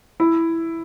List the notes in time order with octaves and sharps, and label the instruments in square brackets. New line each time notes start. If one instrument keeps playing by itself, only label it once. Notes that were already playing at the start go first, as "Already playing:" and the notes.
[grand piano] E4